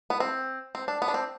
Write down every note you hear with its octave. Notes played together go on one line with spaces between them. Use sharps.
B3
C4
C4
D4
B3
D4
C4